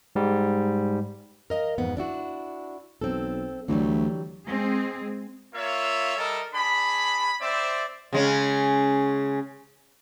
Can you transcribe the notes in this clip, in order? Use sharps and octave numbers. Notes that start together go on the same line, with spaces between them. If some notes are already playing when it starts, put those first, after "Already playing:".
G#2 G3
A#4 D#5 F5
F2 G#2 B3
D4 E4 F#4
B1 C4 A4
D2 E3 F#3 G3
G#3 C4 G#4
A#3 F4 C#5 E5
G3 A4 A#4 D#5 E5
D4 G#4 B5
C4 C5 D5 E5
C#3 G#3 C#4